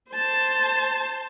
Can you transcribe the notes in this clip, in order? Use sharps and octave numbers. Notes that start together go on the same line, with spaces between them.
C5 A5